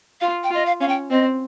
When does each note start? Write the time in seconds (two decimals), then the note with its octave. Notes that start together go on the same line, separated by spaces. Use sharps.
0.21 F4 F5
0.44 G5
0.50 F4
0.54 D#5
0.66 F5
0.80 C#4 F5
0.88 G5
1.10 C4 D#5